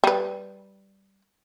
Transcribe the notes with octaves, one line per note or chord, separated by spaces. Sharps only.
G3 B4